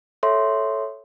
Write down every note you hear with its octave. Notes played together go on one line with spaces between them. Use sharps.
A4 C#5 E5 C6